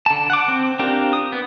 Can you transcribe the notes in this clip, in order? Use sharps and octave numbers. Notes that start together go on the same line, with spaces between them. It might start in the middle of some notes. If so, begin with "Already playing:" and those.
D3 A5
F#5 D6
C4
C4 D4 F4 G4 A#4
D#6
B3